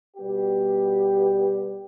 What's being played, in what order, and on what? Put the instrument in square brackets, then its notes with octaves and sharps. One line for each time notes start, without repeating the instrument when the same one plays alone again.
[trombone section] B2 G3 B3 G4